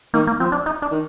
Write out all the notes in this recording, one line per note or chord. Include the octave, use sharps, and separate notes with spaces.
D#3 A#3
A#3
F3 C4
D4
D#4
D4
D#3